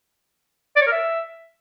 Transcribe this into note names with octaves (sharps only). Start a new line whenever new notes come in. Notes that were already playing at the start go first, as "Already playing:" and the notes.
D5
C#5
A#4
E5